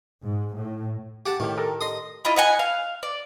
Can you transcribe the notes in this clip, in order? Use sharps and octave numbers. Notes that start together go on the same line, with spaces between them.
G#2
A2
G4 F#5 A5
A2 D#3 G4
G4 A4 A#4
D#5 C6 D#6
E4 F4 D#5
D#5 F#5 G#5
F5
D5